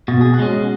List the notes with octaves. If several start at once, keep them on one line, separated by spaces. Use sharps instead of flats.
B2 F#4
G#4
F#4
G#3 C#4